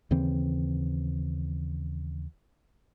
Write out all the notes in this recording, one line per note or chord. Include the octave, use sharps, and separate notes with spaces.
D#2 C#3 E3 C4